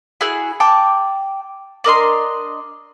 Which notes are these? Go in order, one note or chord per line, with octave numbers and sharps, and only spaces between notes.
E4 F#4 G#4 F#6
G5 A5 D6
D4 A#4 D#5 C6